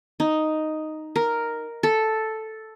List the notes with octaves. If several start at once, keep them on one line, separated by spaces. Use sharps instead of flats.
D#4
A#4
A4